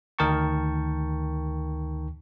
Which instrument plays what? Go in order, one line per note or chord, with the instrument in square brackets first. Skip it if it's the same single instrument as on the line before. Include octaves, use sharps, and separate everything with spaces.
[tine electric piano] D2 D#3 A#4 G5 A5 C#6